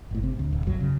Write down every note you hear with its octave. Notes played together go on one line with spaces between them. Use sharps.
G1 A2
C3
D2
D1
B1 F#2 F#3
C#3